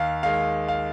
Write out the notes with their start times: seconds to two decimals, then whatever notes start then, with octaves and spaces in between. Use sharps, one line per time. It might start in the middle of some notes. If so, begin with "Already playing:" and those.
Already playing: D#2 F5
0.23 D#3 G#3 F5
0.68 F5